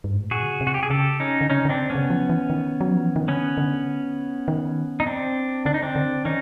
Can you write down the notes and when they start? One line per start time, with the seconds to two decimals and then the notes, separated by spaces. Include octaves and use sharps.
0.04 G2
0.13 G#2
0.22 A2
0.31 A#2 F#4 G#4
0.42 D3
0.52 C#3
0.61 C3
0.67 F#4
0.74 G4
0.83 G#4
0.90 C#3 G4 A4
1.20 C#4 D#4
1.41 D3
1.50 C#3 C#4 D#4
1.65 D3
1.69 C4 D4
1.90 B3 C#4
1.95 C#3
2.10 F3
2.30 E3
2.50 D#3
2.81 F#3
2.92 F3
3.04 E3
3.16 D#3
3.28 D3 B3 C#4
3.57 D3
4.48 D#3
5.00 D#4
5.07 C4 D4
5.66 D3 D4
5.74 D#4
5.83 C4 D4
5.96 D3
6.25 D#3 C#4 D#4